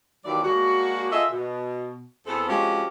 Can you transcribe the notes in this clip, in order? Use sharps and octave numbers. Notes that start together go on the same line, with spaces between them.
D#2 D#3 E3 F#3 D5
G#3 A#3 D4 F#4
F4 G#4 A4 D#5 E5
B2
E2 B3 C4 A4
F3 G#3 C4 C#4 F#4 G4